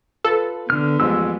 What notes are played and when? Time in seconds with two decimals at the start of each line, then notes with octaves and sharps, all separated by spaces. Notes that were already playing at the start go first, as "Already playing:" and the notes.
0.24 F4 A4 B4
0.70 D3 B3 F6
1.00 A1 F2 G#3 E6